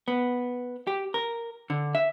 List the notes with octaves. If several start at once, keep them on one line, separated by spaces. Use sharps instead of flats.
B3
G4
A#4
D3
E5